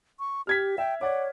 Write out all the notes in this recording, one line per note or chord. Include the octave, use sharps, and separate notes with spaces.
C#6
G4 F6 G#6 B6
E5 G5
C#5 D5 F#5 D6